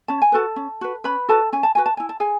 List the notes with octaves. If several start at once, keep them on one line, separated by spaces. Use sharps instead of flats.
C#4 A5
G#5
F#4 A4 B4 A5
C#4
F#4 B4
C#4 B4 B5
F#4 A4 B4 A5
C#4 G#5
A5
F#4 B4 G#5
A5
E4 G#5
A5
G#4 G#5